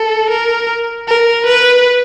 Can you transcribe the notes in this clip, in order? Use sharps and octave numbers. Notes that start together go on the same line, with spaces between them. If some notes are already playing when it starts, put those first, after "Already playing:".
Already playing: A4
A#4
A#4
B4